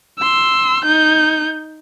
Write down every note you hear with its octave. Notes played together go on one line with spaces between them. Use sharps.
C6 E6
D#4 G6